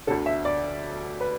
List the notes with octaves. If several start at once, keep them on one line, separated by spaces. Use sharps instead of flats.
D2 D3 A4
E5
D5
B4